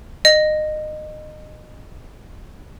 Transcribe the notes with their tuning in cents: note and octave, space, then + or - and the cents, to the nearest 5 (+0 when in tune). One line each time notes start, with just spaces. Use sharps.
D#5 -25